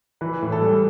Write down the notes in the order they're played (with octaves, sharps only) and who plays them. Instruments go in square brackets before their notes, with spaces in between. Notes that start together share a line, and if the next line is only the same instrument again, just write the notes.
[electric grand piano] E3 [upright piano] B4
[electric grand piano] A2
[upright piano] A4
[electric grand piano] G3